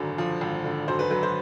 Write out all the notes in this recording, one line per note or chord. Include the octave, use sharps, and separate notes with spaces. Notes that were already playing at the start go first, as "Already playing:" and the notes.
Already playing: G#1 F#2 D3
F3
G#1
D3
F#2 C5
B4
F#3 B4
C5